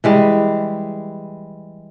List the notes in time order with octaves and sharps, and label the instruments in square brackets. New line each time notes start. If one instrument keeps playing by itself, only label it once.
[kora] E3 G3 G#3